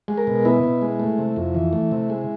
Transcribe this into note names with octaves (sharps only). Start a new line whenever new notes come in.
G#3
A#4
B2
B3 E4
B2
G#3
A3
C3
F2
E3
A3
C3
G#3